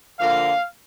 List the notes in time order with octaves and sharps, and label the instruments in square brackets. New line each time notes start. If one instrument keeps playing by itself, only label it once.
[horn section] D3 F3 A#3 F5